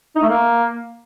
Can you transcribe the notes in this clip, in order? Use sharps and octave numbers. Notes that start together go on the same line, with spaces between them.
D#4
A3
A#3